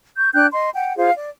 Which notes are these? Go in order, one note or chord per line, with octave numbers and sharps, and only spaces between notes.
C#6 G6
D4 G5 F#6 G6
D#5 C6
F#5 G5
F4 G#4 C5 F5
D5